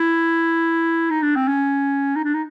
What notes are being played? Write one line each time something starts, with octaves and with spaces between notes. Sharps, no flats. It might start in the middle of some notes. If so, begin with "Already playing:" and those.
Already playing: E4
D#4
D4
C4
C#4
D#4
D4
D#4